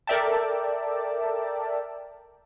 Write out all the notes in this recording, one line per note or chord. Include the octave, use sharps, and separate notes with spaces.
A4 A#4 D5 E5 G5 A5